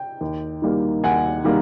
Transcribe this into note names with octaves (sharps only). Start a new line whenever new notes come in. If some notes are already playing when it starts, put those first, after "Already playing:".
Already playing: G5
D#2
D#3 G3 A#3
D#2 F#5 G#5
D#3 G3 A#3